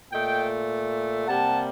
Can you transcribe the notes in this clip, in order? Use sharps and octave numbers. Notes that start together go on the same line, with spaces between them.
A#2 A3 D#5 G5
C3 G3 A#3 F#5 A5